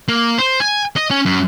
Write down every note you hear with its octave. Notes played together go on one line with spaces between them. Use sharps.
A#3
C5
G#5
D#5
C#4
F#2